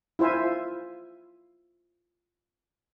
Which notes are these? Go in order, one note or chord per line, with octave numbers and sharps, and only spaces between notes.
E4 F4 C5 E5 G#5